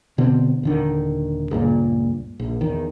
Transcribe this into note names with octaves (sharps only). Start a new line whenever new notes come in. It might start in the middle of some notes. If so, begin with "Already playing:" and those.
B2 D3 B3 C4
D#1 D3 D#3
C#2 G2 A#2
A#1
E2 D#3